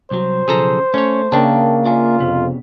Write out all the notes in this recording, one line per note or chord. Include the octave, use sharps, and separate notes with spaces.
C2 F#3 C5
B1 C#3 F3 G#4 A4 A#5
A3 C#4 C#5
C#3 A#3 D4 E5 G5 A5
F4 D5 E5 G#5
F2 C3 B3